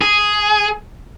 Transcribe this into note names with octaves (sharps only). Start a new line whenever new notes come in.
G#4